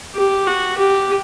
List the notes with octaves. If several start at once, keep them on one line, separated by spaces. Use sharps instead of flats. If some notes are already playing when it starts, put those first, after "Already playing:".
G4
F#4
G4